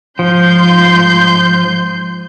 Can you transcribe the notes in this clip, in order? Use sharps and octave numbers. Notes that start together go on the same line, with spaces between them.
G#2 F3 C6 G6